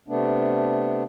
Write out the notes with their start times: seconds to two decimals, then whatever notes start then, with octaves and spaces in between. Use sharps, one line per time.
0.08 C3 A3 B3 D4